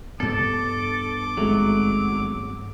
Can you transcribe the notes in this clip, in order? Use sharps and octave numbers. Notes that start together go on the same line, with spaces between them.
G2 B3 A4 D6
G#1 F#3 G#3 A3